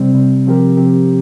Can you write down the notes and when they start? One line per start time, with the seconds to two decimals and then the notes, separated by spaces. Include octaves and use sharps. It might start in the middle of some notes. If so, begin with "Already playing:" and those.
Already playing: C3 G3 C4
0.14 C3 G3 C4
0.46 C3 F3 C4 G4 A#4
0.77 C3 F3 C4 G4 A#4